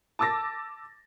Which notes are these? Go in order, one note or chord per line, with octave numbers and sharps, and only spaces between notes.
A5 D6 E6 A6 A#6